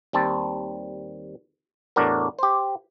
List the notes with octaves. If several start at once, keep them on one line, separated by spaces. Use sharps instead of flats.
D#2 G3 C4 A5
E2 A2 D4 F#4 A#4
G4 C5